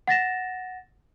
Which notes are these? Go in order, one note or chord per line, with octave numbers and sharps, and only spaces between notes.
F#5 A6 A#6 E7